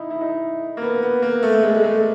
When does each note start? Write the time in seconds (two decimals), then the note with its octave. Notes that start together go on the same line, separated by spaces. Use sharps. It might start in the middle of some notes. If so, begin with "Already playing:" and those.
Already playing: D#4 E4
0.10 E4
0.21 D#4
0.77 A#3
0.82 B3
1.03 B3
1.22 A#3
1.43 A3
1.54 A3
1.63 G#3
1.74 G#3
1.84 A3